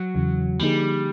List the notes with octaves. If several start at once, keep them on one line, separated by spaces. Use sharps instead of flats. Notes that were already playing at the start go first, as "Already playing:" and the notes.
Already playing: F#3
E2 C#3 E3
D3 F3 G3 A#3 D#4 G#4